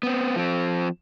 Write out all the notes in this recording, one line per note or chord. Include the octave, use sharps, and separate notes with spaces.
B3 C4
F3 C4